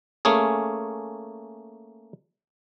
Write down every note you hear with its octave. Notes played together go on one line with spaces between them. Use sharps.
A3 A#3 C#4 G#4